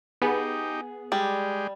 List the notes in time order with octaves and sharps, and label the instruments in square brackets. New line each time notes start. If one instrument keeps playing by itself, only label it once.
[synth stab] B3 [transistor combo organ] D#4 G4 [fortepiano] G#4
[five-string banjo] G3 [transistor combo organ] G#3 G4